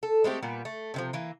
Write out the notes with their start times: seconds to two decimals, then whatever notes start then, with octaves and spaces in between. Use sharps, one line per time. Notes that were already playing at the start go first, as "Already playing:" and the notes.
0.03 A4
0.24 G#3 A3 C4 G4
0.43 A#2 G3 B3
0.65 A3
0.94 C3 D#3 F3
1.13 E3 A#3